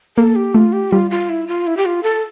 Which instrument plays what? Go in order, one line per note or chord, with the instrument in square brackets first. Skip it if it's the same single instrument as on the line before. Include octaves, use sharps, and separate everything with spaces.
[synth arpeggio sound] A#3 [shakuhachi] A4
[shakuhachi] G4
[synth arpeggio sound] A3 [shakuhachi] F4
[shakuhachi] G4
[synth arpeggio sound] G3 [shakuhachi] F4
[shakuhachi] F4
E4
F4
E4
G4
F4
A4